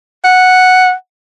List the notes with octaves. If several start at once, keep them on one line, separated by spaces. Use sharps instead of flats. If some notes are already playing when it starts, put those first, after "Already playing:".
F#5